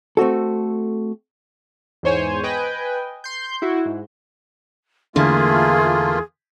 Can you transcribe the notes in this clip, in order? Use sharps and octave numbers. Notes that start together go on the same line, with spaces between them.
A3 C4 F#4 A4
E2 G#2 C5 C#5 G#5
B4 D#5 G5 G#5
C6 G6
E4 F#4
G#2
E2 D3 E3 A3 A#3 F4 G#4